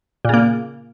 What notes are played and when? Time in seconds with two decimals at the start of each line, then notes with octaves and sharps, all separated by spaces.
0.25 A#2
0.29 C#3
0.34 A#3